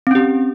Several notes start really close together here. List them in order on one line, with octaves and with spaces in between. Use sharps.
C4 C#4 G4